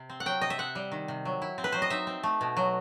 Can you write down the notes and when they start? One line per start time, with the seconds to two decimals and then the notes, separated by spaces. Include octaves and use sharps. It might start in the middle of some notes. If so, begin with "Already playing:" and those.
Already playing: C3
0.10 C4
0.20 F#5
0.26 F#3 G5
0.41 C3 D#5
0.50 E5
0.58 C4 F#5
0.75 G3
0.92 D#3
1.08 C3
1.25 F#3
1.42 E4
1.58 C4
1.64 B4
1.72 F#3 C5
1.82 D#5
1.90 D#4 E5
2.07 C4
2.23 A3
2.41 B2
2.57 F#3